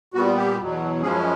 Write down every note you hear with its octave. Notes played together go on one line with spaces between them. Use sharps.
A#2 G3 B3 F#4
G4
E2 B2 F#3
F#2 C#3 F3 G#3 C#4 G#4